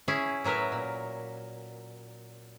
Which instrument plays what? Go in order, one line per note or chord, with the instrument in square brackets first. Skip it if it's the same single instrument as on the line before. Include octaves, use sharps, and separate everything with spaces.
[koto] C#4 E4 G#4
A2 F#3 A#4 B4 E5
A#2